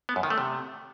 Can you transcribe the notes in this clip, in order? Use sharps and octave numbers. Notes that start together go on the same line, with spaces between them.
B3
F#2
D#3
A3
C3